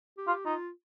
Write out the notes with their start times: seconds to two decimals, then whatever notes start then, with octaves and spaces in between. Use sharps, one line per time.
0.18 G4
0.27 F4
0.45 D#4 F4